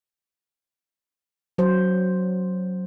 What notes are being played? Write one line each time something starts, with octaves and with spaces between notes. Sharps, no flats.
F#3 C5